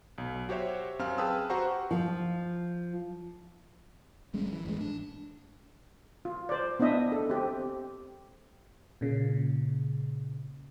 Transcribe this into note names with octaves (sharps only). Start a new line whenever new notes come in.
B1
F#4 G4 C5 C#5 E5
F#2 C4 F5 F6
G#4 B4 G5 A5 D#6 E6
F#4 G4 C5 F#5 A#5 C#6
F3
F#1 G3 G#3 C#4
E3
A1 G#2 C3 G#3
D4
F4
C5 D5
B3 D4 E4 D#5 E5
A4
C4 G4
A#2 C#3